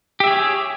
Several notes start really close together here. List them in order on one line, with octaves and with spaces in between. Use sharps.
G4 E5 G#4 C#5